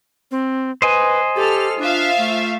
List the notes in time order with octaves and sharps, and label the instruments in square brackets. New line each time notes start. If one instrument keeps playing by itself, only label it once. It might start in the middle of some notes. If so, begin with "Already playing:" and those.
[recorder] C4
[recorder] B4 [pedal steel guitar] C5 D#5 G#5
[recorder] G4 [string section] A4 F6
[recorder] D4 [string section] F4 E5 F5
[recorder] A3